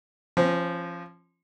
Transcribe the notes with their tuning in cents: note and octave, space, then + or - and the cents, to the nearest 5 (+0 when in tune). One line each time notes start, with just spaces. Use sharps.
F3 -15 C#4 -40